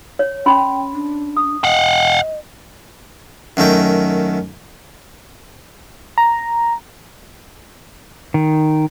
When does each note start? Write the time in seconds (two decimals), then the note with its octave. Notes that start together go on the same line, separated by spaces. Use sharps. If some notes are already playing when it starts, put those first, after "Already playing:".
0.19 C#5
0.46 C#4 G5 B5 C6
0.93 D4
1.37 D#6
1.64 D#5 F5 F#5
3.57 F#2 D#3 A3 G5
6.18 A#5
8.34 D#3